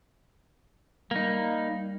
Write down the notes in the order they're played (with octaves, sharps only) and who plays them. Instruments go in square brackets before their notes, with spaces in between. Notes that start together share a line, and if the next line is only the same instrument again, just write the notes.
[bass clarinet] G3 [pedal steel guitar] A#3 D#4